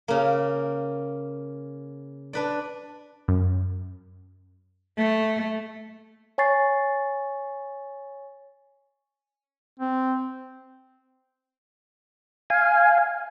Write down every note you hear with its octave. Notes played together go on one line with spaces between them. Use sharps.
C#3 A#3
D4 B4 D5
F#2
A3
C#5 G#5 C#6 A6 C7
C4
F5 G#5